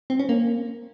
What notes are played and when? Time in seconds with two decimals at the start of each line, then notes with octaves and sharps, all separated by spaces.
0.10 C4
0.19 C#4
0.29 A#3